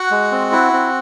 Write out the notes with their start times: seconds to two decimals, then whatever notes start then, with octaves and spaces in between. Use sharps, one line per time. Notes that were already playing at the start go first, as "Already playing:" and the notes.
Already playing: F#4 F#5
0.11 G#3
0.32 C4
0.52 E4
0.73 C4